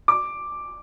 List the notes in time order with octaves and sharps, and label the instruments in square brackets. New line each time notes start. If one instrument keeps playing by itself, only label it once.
[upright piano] D6